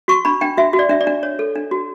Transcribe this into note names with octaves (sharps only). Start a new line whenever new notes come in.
F#4 C#6
D4 B5
D4 G5
F#4 E5
F#4
D5
D4 E5
D5
D4
C#5
A4
D4
F#4